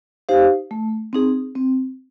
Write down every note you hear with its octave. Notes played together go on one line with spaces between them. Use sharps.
D#4 G4 C5 F5
A3
C4 D#4 G#4
C4